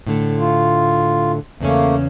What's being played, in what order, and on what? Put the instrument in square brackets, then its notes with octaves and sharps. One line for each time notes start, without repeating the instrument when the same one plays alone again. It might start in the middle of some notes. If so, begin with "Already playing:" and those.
[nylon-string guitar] A2 D3 A3
[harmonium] F4
[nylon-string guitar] E2 C#3 C#4 [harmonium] A3 A#3